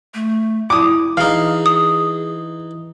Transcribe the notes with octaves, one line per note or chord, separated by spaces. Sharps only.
A3
E4 D6 D#6
E3 D#4 G#4 F5
D#6